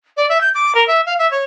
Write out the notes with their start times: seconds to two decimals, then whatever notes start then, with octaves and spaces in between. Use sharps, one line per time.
0.17 D5
0.29 E5
0.41 G6
0.55 D6
0.75 A#4
0.87 E5
1.06 F5
1.19 E5
1.31 C#5